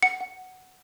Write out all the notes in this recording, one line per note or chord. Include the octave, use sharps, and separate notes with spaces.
F#5 C#7
F#5